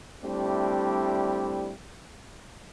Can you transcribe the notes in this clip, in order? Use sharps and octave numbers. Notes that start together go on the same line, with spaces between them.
G3 A3 C4 D4 E4 G4